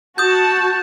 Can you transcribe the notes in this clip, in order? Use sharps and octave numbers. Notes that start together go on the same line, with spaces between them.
F#4 A5 D#6 G6